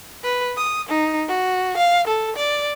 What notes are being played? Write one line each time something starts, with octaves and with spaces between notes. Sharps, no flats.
B4
D#6
D#4
F#4
F5
A4
D5